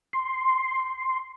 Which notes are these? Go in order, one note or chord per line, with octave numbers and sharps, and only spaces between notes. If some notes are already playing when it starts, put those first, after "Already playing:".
C6